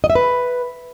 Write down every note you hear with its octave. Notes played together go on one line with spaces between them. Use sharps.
D#5
E5
B4